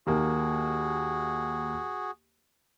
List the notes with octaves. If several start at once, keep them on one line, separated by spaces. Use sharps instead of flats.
D#2 A#3 F#4 G#4